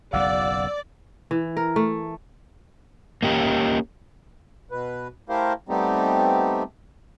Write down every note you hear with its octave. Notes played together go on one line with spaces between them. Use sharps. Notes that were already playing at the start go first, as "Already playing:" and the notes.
F#1 B1 F#2 D5 F5 F#5 E6
E3
A#4
A3
A#3 C#4 G4
B2 B4
A3 E4 G4 A#4 C5 F5
G3 A3 B3 C4 D#4 G4